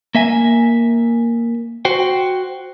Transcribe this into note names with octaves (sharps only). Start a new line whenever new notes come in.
A#3 E5 G#5
F#4 C5 G5